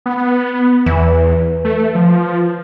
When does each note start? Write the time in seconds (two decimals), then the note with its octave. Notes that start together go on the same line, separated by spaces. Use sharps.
0.06 B3
0.86 E2 E3
1.65 A3
1.95 F3